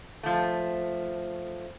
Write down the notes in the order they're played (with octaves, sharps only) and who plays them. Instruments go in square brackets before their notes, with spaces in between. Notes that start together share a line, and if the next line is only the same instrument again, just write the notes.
[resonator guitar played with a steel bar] F3 A3